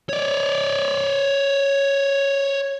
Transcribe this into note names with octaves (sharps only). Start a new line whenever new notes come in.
C#5 D5